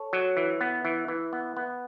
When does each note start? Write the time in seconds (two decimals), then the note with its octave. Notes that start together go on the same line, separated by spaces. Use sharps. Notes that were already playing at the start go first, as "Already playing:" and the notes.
Already playing: A4 C#5
0.13 F#3
0.37 E3
0.61 B3
0.85 E3
1.08 E3
1.33 B3
1.57 B3